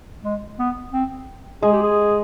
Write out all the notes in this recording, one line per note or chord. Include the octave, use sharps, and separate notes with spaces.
G#3
B3
C4
G#3 G#4
G4
G#4